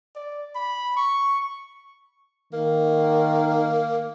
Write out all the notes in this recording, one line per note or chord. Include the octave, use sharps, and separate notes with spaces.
D5
B5
C#6
D#3 A#3